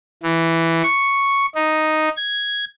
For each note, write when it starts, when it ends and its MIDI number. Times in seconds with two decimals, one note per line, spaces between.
0.23 0.82 52
0.83 1.46 85
1.55 2.09 63
2.17 2.65 92